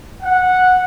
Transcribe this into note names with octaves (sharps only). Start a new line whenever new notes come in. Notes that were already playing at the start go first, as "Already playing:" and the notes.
F#5